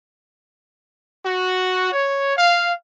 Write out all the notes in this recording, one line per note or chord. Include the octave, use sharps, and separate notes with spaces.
F#4
C#5
F5